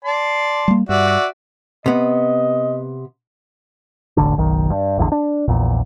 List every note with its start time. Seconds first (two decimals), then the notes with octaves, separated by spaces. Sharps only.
0.05 D5 A5 C6
0.68 G3 A#3
0.89 G2 F#4 D5 E5
1.86 C3 B3 D#5
4.17 E1 A1 D3 D4
4.36 F#1 B1 D#3
4.70 G2
4.98 A1 E2 G2 D3
5.12 D4
5.48 A#1 E2 A#2